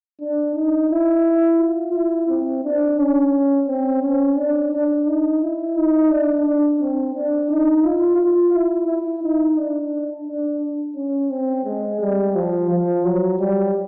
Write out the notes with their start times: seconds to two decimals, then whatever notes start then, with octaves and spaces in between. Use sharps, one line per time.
0.21 D4
0.55 D#4
0.91 E4
1.60 F4
1.94 E4
2.29 C4
2.64 D4
2.99 C#4
3.67 C4
4.02 C#4
4.37 D4
4.72 D4
5.07 D#4
5.42 E4
5.76 D#4
6.10 D4
6.46 D4
6.81 C4
7.15 D4
7.50 D#4
7.85 F4
8.19 F4
8.53 E4
8.88 E4
9.23 D#4
9.57 D4
10.27 D4
10.96 C#4
11.30 C4
11.65 G#3
12.01 G3
12.35 F3
12.70 F3
13.04 F#3
13.39 G3